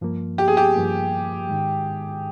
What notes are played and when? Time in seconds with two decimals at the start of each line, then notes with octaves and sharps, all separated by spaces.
0.01 G2 F3 A#3
0.38 G4
0.48 G#4
0.57 G4
0.76 G2 F3 A#3
1.49 G#2 D#3 G#3